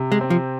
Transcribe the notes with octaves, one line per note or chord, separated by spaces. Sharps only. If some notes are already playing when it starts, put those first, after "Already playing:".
Already playing: C3
G#3
C4
F3